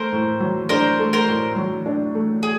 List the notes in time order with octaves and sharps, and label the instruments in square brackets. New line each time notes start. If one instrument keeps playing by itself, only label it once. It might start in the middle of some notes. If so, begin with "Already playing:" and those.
Already playing: [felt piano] A3 [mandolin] A#4 C5
[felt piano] A2
F#3
[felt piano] D4 [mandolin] A#4 C5
[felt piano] A3
[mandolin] A#4 C5
[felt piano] A2
F#3
D4
A3
[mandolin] G#4